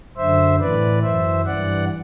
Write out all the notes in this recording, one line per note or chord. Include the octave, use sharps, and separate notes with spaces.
F#2 D3 C5 E5
A2 E3 B4 D5
F#2 E3 C5 E5
G2 E3 D5 F#5